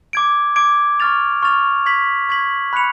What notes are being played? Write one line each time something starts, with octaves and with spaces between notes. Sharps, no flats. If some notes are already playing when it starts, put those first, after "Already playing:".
D6 G#6 D7
D6 G#6 D7
C#6 F6 A6 F7
C#6 F6 A6 F7
C#6 G#6 B6 F#7
C#6 G#6 B6 F#7
B5 F#6 C#7 F7